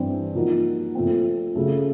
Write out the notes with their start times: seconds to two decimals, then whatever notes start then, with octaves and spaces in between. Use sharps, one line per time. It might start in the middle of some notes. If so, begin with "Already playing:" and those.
Already playing: G2 E3 G3 C4
0.35 A#2 F3 A#3 D#4 F#4
0.95 A#2 F3 A3 C4
1.55 C#3 F#3 A3